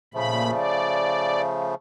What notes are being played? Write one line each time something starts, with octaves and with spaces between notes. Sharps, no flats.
A#2 C#3 F3 A3 B5
D5